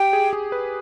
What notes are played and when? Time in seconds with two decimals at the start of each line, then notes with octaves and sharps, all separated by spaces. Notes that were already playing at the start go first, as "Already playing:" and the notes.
Already playing: G4 G5
0.13 G#4
0.33 G#4
0.52 B4